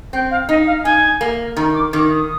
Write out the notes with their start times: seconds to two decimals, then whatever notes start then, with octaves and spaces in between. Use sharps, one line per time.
0.13 C4 G5
0.31 F5
0.49 D#4 D#5
0.67 F5
0.84 D#4 G#5
1.21 A#3
1.57 D#3 A#5
1.74 D6
1.93 D#3 D6
2.11 D#6